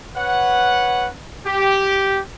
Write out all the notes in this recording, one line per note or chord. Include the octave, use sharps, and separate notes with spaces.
B4 C#5 F#5
G4